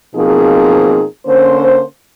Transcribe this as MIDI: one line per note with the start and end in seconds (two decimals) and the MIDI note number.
0.16 1.04 47
0.16 1.04 53
0.16 1.04 58
0.16 1.04 60
0.16 1.04 63
0.16 1.04 68
1.27 1.84 50
1.27 1.84 58
1.27 1.84 61
1.27 1.84 72